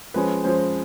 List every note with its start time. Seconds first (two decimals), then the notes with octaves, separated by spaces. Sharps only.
0.14 F3 G#3 C#4 B4
0.44 F3 G#3 C#4 C5